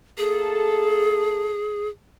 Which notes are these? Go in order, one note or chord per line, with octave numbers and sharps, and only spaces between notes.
A2 A#3 G#4 A4